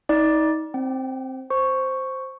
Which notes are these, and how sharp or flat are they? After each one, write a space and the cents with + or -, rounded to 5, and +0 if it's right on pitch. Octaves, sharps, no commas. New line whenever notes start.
D#4 +30 D5 +0
C4 +5 G5 -40
C5 +0 C#6 +0